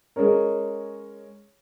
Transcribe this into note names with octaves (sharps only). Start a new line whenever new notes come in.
G#3 C#4 A#4 C#5